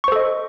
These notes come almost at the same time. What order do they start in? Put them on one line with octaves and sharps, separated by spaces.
C#6 C5 A4 D#5